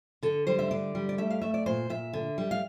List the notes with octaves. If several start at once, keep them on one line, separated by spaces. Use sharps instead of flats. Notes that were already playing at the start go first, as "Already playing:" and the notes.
D3 A4
G3 C5
E5
D3 D5
G3
D5
A3 E5
F5
A3 E5
D5
A#2 C5
A#2 E5
D3
G3
F5